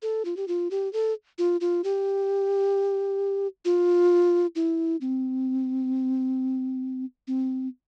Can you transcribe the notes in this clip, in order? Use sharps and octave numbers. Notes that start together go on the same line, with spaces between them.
A4
F4
G4
F4
G4
A4
F4
F4
G4
F4
E4
C4
C4